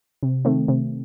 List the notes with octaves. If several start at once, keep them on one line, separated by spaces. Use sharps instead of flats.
C3
D#3 A3 C4
C3